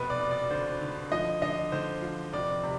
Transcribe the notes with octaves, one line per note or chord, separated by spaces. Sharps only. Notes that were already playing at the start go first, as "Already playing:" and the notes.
Already playing: F1 B2 B4
D5
F1
D5
D3 C5
D3
F3 D#5
D3 D#5
D3 C5
F3
F1 D5
C3